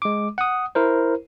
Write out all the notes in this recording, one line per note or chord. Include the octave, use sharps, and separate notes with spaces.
G#3 D6
F#5 D#6
E4 A#4 C5